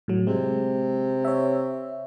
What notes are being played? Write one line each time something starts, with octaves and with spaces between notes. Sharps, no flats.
A2 F#3
C3 G#3
C#5 E5